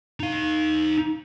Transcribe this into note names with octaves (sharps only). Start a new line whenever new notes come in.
D#4 F5